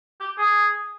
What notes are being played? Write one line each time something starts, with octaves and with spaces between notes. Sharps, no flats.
G4
G#4